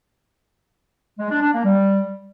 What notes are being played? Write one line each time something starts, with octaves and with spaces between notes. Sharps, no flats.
G#3
D4
D4
A#3
G3